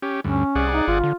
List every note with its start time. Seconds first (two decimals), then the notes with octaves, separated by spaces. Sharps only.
0.02 C#4 G4
0.24 D2 G2 C#4
0.56 C2 G#4 D5 F#5
0.73 D#4
0.88 G1 F4
1.04 D3